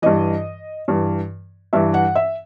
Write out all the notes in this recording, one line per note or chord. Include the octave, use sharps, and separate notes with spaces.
G2 E3 D#5
G2 E3
G2 E3 E5
F#5
E5